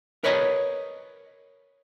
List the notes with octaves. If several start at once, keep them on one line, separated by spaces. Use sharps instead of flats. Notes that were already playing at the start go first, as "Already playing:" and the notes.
A#4 B4 C#5 D#5 A5 A#5